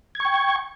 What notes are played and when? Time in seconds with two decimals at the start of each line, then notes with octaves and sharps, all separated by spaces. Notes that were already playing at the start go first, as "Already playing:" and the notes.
0.15 G#6
0.20 C#6
0.25 G5